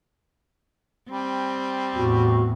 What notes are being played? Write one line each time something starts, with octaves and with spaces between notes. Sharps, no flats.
G3 C4
E2 A2 F#4